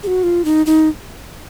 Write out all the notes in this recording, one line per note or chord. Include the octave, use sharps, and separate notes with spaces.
G#4
F#4
F4
D#4
D#4